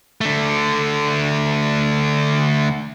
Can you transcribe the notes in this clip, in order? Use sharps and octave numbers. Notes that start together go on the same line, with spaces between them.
D3 A3